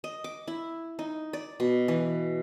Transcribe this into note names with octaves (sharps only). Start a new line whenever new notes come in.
D#5
D6
E4
D#4
D5
B2
E3